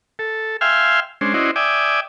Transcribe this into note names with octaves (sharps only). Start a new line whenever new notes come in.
A4
E5 F5 G5 G#5 C6 F6
G#3 C#4 D4 C5
C#4 E4 F#4 C5 D5 D#5
D5 E5 G5 G#5 D6 D#6